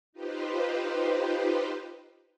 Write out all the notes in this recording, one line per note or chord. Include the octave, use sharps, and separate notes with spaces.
D#4 F4 G4 B4 C5